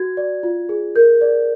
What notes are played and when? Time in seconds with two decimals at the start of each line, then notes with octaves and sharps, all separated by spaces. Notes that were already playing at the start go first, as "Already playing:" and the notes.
Already playing: F#4 G#6
0.17 D5
0.43 F4
0.69 G#4
0.95 A#4 G6
1.21 D5